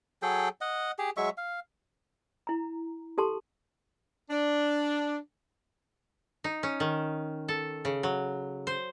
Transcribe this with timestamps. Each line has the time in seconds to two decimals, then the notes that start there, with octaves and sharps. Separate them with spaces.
0.22 F#3 G#4 A4 G5
0.61 D#5 F#5
0.99 G4 G#4
1.17 F#3 G#3 E5 C#6
1.37 F5
2.47 E4 A#5
3.18 G4 A4 A5 C6
4.30 D4
6.44 D#4
6.63 C#4
6.80 D#3
7.48 A4
7.85 C#3
8.03 F#3
8.67 C5